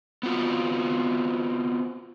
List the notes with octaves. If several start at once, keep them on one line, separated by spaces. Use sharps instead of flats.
B3 C4 F4 F#4